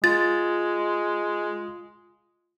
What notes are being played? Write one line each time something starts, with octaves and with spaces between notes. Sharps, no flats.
G#3 F4 A6